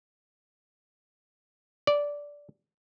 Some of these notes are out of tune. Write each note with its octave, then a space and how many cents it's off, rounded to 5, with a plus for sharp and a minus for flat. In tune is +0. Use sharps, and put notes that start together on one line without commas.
D5 -10